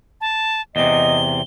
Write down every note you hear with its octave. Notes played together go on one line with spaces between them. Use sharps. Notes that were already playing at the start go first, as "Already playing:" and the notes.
A5
E2 C3 D#5 G7